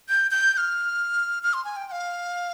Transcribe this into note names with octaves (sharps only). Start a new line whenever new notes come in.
G6
G6
G6
F6
F6
C6
G#5
G5
G5
F5